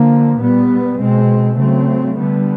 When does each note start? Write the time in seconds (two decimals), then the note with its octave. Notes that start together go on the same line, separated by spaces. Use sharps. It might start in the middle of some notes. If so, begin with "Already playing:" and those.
Already playing: D3 F3 A#3
0.39 A#2 G3 B3
0.99 B2 G#3 C4
1.57 C#3 F#3 A3 C4
2.16 D3 G3 B3